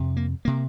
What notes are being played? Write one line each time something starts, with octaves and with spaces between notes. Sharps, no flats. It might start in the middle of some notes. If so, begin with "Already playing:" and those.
Already playing: F2 C3
A#3
C3 A#3